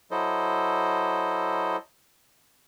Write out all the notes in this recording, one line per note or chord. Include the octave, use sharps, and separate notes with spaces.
F#3 E4 A4 C5 D#5